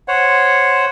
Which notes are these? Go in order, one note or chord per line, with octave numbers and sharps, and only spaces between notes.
C5 C#5 F#5